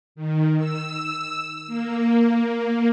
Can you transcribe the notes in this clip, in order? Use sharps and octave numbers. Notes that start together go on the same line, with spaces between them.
D#3
E6
A#3